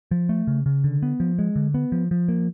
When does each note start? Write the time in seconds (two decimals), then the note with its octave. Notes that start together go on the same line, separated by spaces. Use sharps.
0.11 F3
0.29 A3
0.47 C#3
0.66 C#3
0.84 D3
1.03 B3
1.20 F3
1.39 G#3
1.56 D3
1.74 B3
1.92 F3
2.11 F3
2.29 A#3